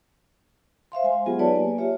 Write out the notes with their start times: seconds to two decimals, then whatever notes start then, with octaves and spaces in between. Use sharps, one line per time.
0.92 C5 E5 F5 C6
1.04 G#3 G#5
1.26 F#3 B3 F4 G4 G#4
1.39 D#4 B4 C#5 D5 A5
1.54 A#3 G#5
1.78 F4 G4 C#5 E5